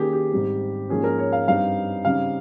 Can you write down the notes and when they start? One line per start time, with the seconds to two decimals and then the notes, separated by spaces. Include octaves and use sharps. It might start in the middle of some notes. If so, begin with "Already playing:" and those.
Already playing: D#3 A#3 C#4 G4 G#4
0.13 G4
0.32 G#2 G3 C4
0.89 G#2 F3 A#3 C#4 G#4
1.04 A#4
1.18 C#5
1.32 F5
1.47 G2 G3 C4 D#4 F5
2.05 C#3 G3 C4 D#4 F5